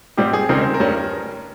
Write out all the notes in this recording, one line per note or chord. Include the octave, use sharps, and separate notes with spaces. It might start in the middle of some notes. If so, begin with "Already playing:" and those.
G#2 G3 C4 G4
G#4
C#2 C#3 G3 C4 D#4 A#4
C5
A#4
G2 G3 C#4